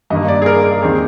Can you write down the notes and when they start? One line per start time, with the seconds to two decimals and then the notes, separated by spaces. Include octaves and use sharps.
0.10 G2 D#3 A#3 D#5
0.28 D5
0.42 G#4
0.46 A#4
0.64 A#4
0.82 D#2 D#3 G#3 C4 G#4